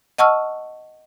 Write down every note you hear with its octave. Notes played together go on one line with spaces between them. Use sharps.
D#5 F#5 A5 C#6 E6 F6